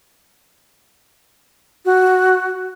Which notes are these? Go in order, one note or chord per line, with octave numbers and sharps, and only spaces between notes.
F#4